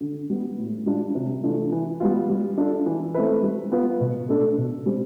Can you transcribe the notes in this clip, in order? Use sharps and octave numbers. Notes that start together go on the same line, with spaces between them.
D3
G3 B3
A2
G3 D4 F4
C3
E3 A3 D4 F4
E3
G3 B3 F4
G3
D4 F4 A4
E3
A3 C4 E4 B4
G3
B3 F4 B4
B2
A3 D4 A4
B2
G3 C4